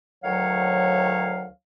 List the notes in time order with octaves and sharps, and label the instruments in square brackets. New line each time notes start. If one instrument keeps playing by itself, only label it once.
[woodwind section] D2 D#3 F#3 C#5 F5 F#5